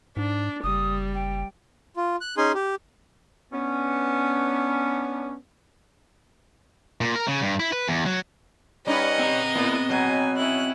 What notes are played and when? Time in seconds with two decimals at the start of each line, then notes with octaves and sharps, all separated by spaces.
0.17 G#2 D4
0.64 F#1 G3 D#6
1.14 G5
1.97 F4
2.21 F#6
2.37 C#4 D#4 G#4 G#5 C6
2.55 G4
3.53 B3 C#4 D4
7.01 A#2
7.15 A#4
7.28 C#3
7.42 G2
7.60 E4
7.72 B4
7.88 E2
8.06 F#3
8.87 G3 C#4 D#4 B4 D#5 F#5
9.19 C4 A#5
9.55 A2 B3 E4
9.89 B2 F#3 G#5
10.37 C#4 E4 F#6